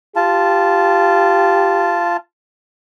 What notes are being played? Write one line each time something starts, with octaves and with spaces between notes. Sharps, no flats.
F4 G4 A5